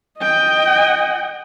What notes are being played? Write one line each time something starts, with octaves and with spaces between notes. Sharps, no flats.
D#5 G5